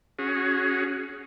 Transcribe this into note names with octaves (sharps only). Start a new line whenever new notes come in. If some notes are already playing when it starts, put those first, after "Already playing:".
C#4 F#4 G#4